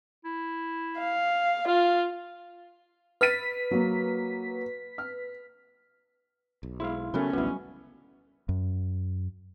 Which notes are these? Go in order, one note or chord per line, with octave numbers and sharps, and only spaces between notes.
E4
F5
F4 F5
B4 F6 A6 B6 D#7
F#3 A#3
F6
B1
G#3 E4 G#4 F5 C6
C#3 F#3 A3 B3 C#4 A#4 B5
A1 D2 F#3 G3 B3 E4 F#4
F#2